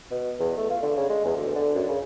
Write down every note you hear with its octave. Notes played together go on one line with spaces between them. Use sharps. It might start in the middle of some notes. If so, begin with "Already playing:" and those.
B2
E2
A3
F4
D3
C#3
G#3
E2
D2
D3
F#2
C#3